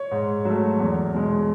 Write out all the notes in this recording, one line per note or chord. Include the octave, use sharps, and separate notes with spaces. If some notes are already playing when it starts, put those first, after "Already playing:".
Already playing: C#5
G#2
F#3 A3
E2
B2 G#3